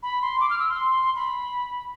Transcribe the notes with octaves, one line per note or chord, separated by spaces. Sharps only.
B5
C6
D6
F6
E6
C6
B5